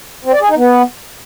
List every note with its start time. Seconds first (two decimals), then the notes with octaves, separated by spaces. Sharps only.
0.25 C4
0.33 D5
0.41 G#4
0.49 D#4
0.57 B3